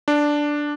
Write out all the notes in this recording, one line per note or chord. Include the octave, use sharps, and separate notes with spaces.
D4